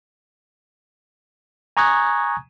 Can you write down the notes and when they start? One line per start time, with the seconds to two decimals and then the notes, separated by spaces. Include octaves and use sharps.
1.77 G#5 A#5 C#6 D#6 F#6 G#6